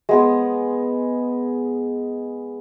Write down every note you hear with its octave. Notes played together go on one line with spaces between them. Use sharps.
G#3 B3 G#4